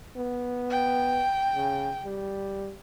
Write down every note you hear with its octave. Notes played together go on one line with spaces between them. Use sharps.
B3
G5
C#3
G3